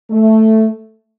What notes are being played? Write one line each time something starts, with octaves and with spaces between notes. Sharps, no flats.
A3